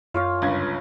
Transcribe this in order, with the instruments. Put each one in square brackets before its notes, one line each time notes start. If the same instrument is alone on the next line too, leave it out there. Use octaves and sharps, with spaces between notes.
[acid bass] F#2 [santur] F4 C#5 F5
[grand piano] G1 C#2 G#6